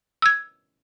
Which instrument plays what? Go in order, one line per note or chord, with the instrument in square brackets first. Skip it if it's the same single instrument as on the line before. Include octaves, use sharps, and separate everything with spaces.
[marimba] E6 G#6